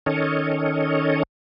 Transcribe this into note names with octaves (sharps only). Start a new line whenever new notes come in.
D#3 C#4 A4 C#5 D#5